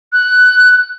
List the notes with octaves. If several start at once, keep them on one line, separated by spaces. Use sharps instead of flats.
F#6